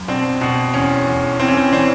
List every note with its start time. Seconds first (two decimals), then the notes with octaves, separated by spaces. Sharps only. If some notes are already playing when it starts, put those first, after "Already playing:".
Already playing: F#2
0.08 B2 C4 D4
0.41 B2
0.74 E2 C#4
1.07 E2
1.40 E3 C4
1.48 C#4
1.57 C4
1.72 E3 C4 D4